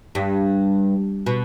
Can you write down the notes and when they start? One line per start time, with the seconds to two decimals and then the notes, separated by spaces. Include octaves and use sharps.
0.15 G2
1.26 B2